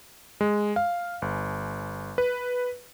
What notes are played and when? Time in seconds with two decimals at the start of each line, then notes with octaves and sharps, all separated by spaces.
0.41 G#3
0.76 F5
1.22 G1
2.18 B4